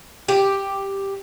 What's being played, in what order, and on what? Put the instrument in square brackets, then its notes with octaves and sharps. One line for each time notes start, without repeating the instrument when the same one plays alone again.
[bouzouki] G4